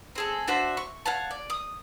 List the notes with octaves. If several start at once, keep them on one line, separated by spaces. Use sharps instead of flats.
C4 G#4 A4
D4 F#4 C5 E5
C#6
C#5 F5 F#5 A5
D5
D#6